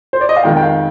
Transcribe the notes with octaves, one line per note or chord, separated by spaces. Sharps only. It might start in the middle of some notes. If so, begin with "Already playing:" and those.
C5
D5
D#5
F5
F2 D#3 G#3 G5
G5
F5